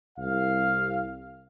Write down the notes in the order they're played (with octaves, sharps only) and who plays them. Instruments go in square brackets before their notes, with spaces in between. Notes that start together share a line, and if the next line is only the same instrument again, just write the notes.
[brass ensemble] C2 F5